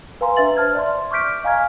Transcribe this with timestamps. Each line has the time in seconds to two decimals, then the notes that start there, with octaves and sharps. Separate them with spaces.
0.21 B4 F5 G#5 A#5 C6
0.36 D4 B4 E5 A6 F#7
0.57 C5 A5 F6 G#6
0.74 D5 E5 C6
1.11 C#6 D6 F6 G6 B6 D7
1.44 D#5 F5 G#5 A#5 F6 G#6